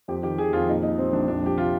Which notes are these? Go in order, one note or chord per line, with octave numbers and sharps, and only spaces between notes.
F2 G4
D#3 G4
D#3 G#4
F2 F4
A#2 D#4
A#2 D#4
G3 C4
A#1 D4
F2 D4
F2 G4
C3 F4